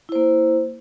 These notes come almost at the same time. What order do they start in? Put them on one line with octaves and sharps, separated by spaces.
E4 C5 A#3